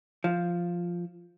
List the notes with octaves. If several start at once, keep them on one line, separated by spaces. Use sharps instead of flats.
F3